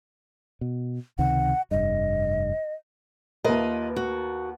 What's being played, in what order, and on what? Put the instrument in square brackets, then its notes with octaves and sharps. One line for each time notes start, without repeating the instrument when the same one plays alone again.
[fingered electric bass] B2
[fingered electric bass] C#2 C3 D#3 [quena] F#5
[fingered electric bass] F1 G2 [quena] D#5
[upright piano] D#2 A#4 [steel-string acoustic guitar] F4 B4 D#5
[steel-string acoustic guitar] F#4